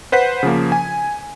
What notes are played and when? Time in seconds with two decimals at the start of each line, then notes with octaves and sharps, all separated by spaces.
0.12 B4 C5 F#5 B6
0.43 C#3 F3 A#3
0.72 G#5